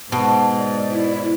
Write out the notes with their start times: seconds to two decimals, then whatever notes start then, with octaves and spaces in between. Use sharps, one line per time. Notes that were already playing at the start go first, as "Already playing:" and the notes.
0.12 G#2 B2 A5
0.58 D5
0.92 E4